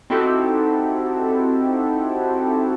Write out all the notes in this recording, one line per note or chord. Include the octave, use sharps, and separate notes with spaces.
C4 D#4 E4 F#4 G4 A4